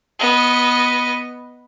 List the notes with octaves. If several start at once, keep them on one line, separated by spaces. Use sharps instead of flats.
B3 D#5